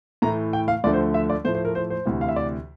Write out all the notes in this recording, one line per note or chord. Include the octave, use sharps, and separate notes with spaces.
A2 E3 A3 A#5
G5
F5
D2 D3 F3 A3 D5
C5
E5
D5
A2 F3 A3 C5
C5
A#4
C5
C5
D2 C3 E3
F5
E5
D5